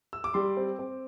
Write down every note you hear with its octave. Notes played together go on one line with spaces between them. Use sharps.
E6
D6
G3 C6
C4
C4